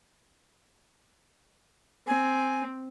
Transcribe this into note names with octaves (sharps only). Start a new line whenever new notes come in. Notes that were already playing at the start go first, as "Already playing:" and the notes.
C4 G#5